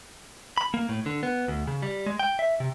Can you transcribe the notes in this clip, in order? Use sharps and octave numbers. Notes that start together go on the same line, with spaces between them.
B5
A#3
A2
D3
B3
D2
C#3
G3
G#3
G5
E5
C3